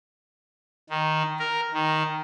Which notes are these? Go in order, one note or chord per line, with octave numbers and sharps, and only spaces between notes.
D#3
A#4
D#3